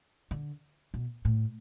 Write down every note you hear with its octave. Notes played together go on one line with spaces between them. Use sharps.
D3
B2
A2